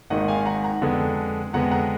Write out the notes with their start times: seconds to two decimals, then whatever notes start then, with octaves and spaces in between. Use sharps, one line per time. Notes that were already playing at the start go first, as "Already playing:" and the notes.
0.10 G#1 G#2 D#3 A#3 D#5 F#5
0.28 F5 G#5
0.46 F#5 A#5
0.64 F#5 A#5
0.82 F2 D3 G#3 B3
1.53 F2 D3 G#3 B3 F#5 A#5
1.71 F#5 A#5